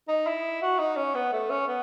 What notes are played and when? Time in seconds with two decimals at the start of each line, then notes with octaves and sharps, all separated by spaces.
0.08 D#4
0.27 E4
0.62 F#4
0.79 D#4
0.97 C#4
1.15 B3
1.33 A3
1.50 C#4
1.67 B3